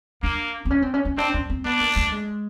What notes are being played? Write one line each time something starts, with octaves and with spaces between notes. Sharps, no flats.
A#3 D4
C4
C#4
C4
C#4
C#4
C4 D4
C#4
C4
B3 D4
A#3
A3
G#3